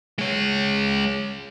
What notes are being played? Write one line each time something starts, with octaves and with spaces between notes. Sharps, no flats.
G#3 C#5